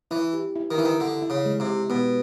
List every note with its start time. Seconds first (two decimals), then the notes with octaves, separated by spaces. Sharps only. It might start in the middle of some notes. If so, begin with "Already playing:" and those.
0.11 E3 E4
0.33 G4
0.56 E4
0.71 D#3
0.78 E3 E4
0.85 D#3
1.00 D3 E4
1.22 E4
1.30 C#3
1.46 G#3
1.60 C3
1.67 G4
1.90 B2 B3